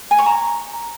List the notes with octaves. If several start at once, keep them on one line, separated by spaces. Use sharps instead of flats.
G#5
C#6
A#5